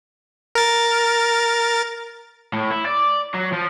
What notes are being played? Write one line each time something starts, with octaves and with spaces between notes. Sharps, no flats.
A#4 A6
A2
E4
D5
F#3
F3